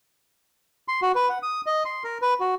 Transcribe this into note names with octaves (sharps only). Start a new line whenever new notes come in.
C6
F#4
B4
F#5
D#6
D#5
C6
A#4
B4
F#4